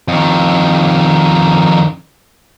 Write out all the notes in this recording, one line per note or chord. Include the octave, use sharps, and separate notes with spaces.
F2 D#3